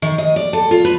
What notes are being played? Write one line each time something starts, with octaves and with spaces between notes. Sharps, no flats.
D#3
D#5
D5
A4
F4
B4